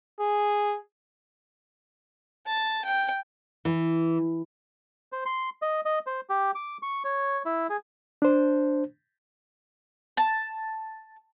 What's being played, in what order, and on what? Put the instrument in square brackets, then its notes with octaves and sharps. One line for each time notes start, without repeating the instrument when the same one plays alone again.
[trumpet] G#4
[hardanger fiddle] A5
G5
[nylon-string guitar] E3
[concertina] C5
C6
D#5
D#5
C5
G4
D6
C#6
C#5
E4
G#4
[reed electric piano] D4 C5
[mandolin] A5